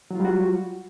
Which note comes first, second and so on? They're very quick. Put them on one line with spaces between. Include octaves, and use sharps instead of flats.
F#3 F4 G3 F#4